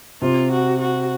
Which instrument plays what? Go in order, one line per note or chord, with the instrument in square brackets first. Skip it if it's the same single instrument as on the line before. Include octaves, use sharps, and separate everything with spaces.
[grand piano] C3 [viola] F4
[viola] F#4
F#4